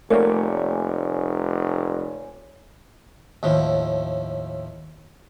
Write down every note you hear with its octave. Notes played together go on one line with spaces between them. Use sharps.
F1 A3 A#3 A#4 C#5 D5 G#5
D#2 A2 F3